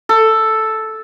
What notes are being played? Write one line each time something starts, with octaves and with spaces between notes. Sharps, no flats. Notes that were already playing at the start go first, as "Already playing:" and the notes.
A4